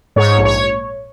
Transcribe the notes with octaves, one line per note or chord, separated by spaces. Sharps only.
G#2 C#5
A#1
C#5